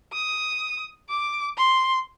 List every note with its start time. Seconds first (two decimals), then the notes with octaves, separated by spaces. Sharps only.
0.13 D#6
1.09 D6
1.57 C6